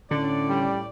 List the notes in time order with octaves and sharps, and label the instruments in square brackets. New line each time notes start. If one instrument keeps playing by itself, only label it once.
[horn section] A2 D5 [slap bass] D3 [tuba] C#4
[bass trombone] G3